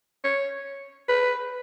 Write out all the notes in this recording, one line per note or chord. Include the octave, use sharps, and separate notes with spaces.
C#5
B4